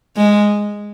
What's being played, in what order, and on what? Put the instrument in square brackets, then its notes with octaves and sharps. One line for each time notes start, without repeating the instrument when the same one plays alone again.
[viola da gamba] G#3